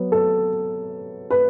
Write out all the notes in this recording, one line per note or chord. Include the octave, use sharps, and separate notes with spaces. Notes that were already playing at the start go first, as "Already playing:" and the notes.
Already playing: F#3 B3
A4
B4